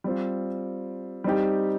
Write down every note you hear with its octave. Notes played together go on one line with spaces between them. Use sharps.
G3 C4 F4
G3 C4 D#4 G4